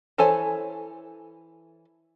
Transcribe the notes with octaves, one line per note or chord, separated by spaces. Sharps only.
E3 A4 C5 C#5 G#5